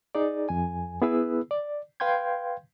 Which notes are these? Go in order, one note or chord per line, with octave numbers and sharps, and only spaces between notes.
D#4 G#4 D5
F2 G#5
B3 E4 G#4 B4 E6
D5
B4 F5 G5 C6 G6 G#6